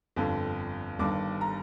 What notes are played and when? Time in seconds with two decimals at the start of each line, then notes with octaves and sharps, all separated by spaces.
0.16 G1 F2 D3
0.99 G1 G2 D#3 D6
1.41 A#5